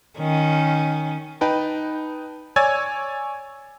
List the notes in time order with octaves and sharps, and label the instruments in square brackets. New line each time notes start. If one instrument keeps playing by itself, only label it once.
[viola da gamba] D#3 C#4
[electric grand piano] D#4 B4 G5 A5
C#5 D5 G#5 E6 G#6 A6